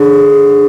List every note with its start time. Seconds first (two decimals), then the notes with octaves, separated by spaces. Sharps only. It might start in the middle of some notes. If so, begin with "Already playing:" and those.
Already playing: D3 G#4